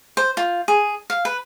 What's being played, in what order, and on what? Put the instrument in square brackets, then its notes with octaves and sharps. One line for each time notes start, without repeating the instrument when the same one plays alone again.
[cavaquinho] C5
F4
G#4
F5
B4